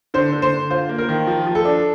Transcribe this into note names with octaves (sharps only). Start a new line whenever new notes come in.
D3 C5
D3
C5
D3
F4 C5
A#3
A#4
D#3
F3
F3
A4
D4